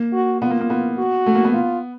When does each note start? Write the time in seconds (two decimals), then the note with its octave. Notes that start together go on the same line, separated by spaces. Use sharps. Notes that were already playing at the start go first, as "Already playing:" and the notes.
Already playing: A#3
0.13 F#4
0.42 B3 F4
0.50 A#3
0.61 A#3
0.70 B3
0.98 F#4
1.26 A3
1.35 A#3
1.45 B3
1.53 F4